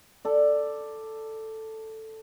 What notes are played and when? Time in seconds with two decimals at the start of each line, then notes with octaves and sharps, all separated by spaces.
0.25 A4 D5